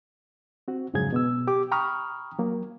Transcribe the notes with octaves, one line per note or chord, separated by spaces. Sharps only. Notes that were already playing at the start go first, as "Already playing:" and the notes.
C4 F#4
F2 G#2 C#3 F#3 G#4 G#6
B2 B3 E6
G4 D6
G5 A#5 B5 C#6 D#6 F6
F#3 A#3